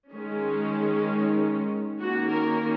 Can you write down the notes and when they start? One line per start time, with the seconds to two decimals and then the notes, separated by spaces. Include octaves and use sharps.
0.14 D#3 G#3 C#4
2.02 D#3 A#3 C#4 F#4
2.33 A#4